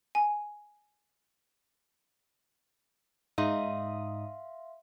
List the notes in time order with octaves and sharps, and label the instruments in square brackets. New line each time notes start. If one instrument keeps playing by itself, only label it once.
[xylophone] G#5
[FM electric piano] G#2 D#4 D#6 [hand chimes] E5 F5 C6